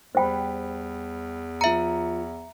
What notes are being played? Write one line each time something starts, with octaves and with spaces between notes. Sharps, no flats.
E2 G3 C5 G5 B5
F3 E5 A#5 C#7